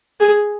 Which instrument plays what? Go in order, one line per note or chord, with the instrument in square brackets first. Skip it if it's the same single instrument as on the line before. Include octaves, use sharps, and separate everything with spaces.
[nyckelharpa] G#4